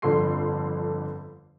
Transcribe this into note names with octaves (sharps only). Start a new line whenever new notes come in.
G1 F2 D3 A4 C6 C7